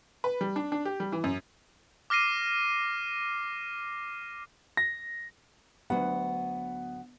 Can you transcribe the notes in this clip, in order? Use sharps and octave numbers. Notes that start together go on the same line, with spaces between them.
B4
G3
D4
D4
G4
G3
E3
F#2
D6 F6 A#6 C7 D#7
A#6
D2 F#3 B3 F#5